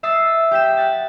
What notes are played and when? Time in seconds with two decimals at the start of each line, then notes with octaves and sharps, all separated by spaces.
0.03 E5 D#6 E6 A6 C7
0.51 G4 G6 B6 E7
0.77 F#5 A6